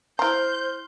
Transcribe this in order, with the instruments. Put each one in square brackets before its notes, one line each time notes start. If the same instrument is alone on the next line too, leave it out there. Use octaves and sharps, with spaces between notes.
[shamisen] E4 A#5 [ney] C5 [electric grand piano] C6 F6 [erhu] G6